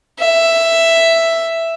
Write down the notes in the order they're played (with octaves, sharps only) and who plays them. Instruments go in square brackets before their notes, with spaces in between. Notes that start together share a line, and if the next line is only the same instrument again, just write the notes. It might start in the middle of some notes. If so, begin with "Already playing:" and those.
[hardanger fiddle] E5